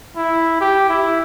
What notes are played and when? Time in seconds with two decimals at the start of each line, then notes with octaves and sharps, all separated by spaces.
0.16 E4
0.60 G4
0.89 E4